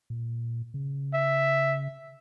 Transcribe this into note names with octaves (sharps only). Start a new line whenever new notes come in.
A#2
C#3
E5